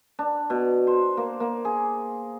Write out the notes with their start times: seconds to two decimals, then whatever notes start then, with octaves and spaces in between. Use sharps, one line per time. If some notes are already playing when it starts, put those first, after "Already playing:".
0.19 D4
0.50 B2
0.87 C5
1.17 A#3
1.40 A#3
1.65 G#4